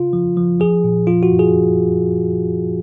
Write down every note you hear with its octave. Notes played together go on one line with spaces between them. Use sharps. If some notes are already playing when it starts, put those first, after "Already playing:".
Already playing: C#3 F4
F3
F3
F3 G#4
A#2
F3 F4
F#4
F#2
G#4